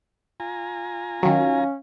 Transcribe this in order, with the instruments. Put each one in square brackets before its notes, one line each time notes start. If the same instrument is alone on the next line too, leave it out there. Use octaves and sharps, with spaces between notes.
[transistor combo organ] F4 G#5 A#5
[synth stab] D#3 F#3 [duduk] C#4 [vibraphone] F5